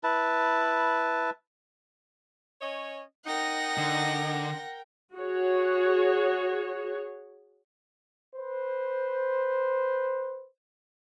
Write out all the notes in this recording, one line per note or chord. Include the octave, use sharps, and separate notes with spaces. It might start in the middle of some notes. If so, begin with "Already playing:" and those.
E4 B4 A5
C#4 C#5 D#5
D#4 A#4 F#5 G5 A#6
D3
F#4 G#4 C#5
B4 C5